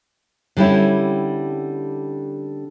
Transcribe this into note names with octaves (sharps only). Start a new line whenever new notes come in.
D3 G3 C4 C#4 E4